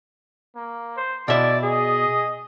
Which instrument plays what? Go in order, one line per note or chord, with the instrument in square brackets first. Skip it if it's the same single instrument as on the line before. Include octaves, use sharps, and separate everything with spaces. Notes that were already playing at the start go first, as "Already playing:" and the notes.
[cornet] A#3
[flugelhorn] C5
[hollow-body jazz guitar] B2 E5 [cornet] E4 [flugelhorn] D5
[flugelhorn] G#4 [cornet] D#5